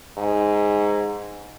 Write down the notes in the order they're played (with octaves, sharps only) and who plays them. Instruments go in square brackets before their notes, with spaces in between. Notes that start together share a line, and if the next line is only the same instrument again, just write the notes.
[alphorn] G#2